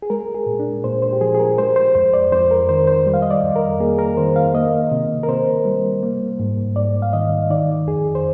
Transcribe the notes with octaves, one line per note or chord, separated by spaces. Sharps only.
G#4
G#3 A#4
G#4
A#2
D4
A#2 C5
C5
G4
F3 G#4
G#4
A#4
G#3 C5
C5
F2 C5
D5
F2 C5
A#4
D#3 C5
C5
G3
F5
D#5
D5
F2
A#4
A#3 G#4
A#4
D#3 C5
F5
A#3 D#5
C3
A#4
C3 C5
G3
A#3
G#2
G#2 D5
F5
D#3 D#5
D#3 D5
F2 G#4
C5